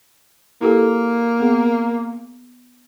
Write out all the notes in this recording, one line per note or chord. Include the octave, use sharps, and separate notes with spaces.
A#3 E4 G4 A4
B3 G#4